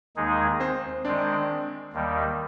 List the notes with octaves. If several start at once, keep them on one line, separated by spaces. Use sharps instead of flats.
D#2 D#3 G#3 D#4 G#4
C4 C5
D#3 G#3 C4 D4 D5
D#2 D#3 G3